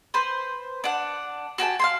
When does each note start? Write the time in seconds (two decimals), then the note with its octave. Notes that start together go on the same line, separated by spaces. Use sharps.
0.14 B4 C5
0.84 D4 F#5
1.58 F#4 G4 G#5 A5
1.79 F5 G5 C6